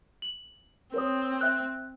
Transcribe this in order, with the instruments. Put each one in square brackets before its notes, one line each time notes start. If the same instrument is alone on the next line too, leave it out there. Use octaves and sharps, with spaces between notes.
[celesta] F#7
[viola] C4 [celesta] A#4 C#5 D#6
[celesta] E5 F#6